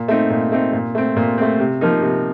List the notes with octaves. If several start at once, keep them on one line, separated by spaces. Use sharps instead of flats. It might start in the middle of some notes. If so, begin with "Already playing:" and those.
Already playing: A#2
A3 C4 D#4
A#2
A3 C4 D#4
A#2
A3 C4
A#2
A3 C4
C3
F3 A#3 D#4
C3